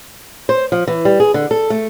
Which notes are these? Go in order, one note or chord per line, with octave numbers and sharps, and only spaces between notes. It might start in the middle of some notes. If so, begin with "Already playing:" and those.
C5
F3
E3
G3
G#4
D3
A4
A3